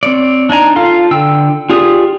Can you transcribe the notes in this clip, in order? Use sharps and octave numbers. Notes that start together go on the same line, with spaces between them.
C4 C#5 D5
D4 D#4 G#5 A#5
F4 A4 F5 C6
D3 G5 E6
F4 G4 G#4 D5 D#6